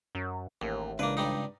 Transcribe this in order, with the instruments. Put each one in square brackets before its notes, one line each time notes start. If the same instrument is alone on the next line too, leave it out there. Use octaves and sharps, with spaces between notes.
[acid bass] F#2
[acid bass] A1 [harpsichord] D#2
[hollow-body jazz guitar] C#2 D4 [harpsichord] A#3 B4
[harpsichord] G2 G3 D#4